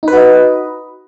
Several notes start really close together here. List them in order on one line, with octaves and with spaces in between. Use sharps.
D#4 B4 F#4 D#5